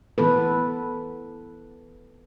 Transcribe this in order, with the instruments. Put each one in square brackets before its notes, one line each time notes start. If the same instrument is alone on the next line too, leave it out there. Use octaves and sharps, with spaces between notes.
[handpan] E3 B3 A4 B4